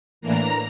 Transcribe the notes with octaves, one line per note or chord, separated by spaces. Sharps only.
A2 E3 A#3 D4 A#5